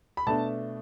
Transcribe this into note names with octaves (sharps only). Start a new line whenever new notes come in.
B5
B2 A3 D4 A5